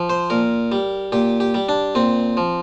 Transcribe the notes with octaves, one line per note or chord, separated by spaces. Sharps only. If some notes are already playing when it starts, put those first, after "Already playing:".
Already playing: F3
C5
A#2 A#4
G3
A#2 G4
G4
G3
D4
A#2 C4
F3